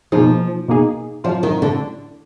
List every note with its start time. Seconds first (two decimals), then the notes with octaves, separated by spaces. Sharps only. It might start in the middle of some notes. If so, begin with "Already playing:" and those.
0.12 B2 F3 A#3 D#4 G#4
0.68 B2 A#3 D#4 G#4
1.24 F3 F#3 D4 F4
1.43 D#3
1.62 D3